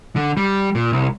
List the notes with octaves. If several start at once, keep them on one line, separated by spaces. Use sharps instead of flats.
D3
G3
A#2
C2